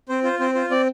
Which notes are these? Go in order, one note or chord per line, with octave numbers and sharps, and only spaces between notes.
C4 C5
F4 C5
C4 C5
F4 C5
C4 D5